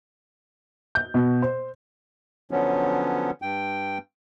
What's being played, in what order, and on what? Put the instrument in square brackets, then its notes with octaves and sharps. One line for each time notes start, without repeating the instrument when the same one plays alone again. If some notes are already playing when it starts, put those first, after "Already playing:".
[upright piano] G6
B2
C5
[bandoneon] D3 F3 F#3 B3 C#4
G2 G5